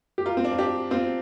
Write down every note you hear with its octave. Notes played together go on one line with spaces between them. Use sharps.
G4
F4 A#4
C4
D4
F4
D4 G4
C4 F4